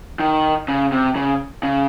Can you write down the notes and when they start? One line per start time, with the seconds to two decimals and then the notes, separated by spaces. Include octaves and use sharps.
0.19 D#3
0.68 C#3
0.92 C3
1.16 C#3
1.63 C#3